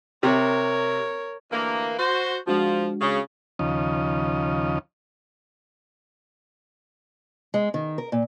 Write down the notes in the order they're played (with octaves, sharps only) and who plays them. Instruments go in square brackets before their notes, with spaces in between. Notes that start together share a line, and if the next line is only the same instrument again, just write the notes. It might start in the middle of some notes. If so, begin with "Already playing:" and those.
[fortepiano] C3 [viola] A#4 C#5
[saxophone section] D2 E3 A#3
F#4 C5
[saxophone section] F3 [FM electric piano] G#3 D4 F#4
[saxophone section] C#3
[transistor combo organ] D#2 C#3 F3 D#5
[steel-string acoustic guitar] G#3
D#3
A#4
A#2